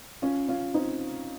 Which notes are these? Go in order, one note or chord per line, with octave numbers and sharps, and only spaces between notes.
C#4 F4
C#4 F4
C4 D#4